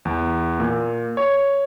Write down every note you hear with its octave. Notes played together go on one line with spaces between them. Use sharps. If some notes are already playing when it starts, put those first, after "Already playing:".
E2
A#2
C#5